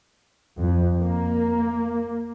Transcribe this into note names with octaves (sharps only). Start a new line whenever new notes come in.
F2
A#3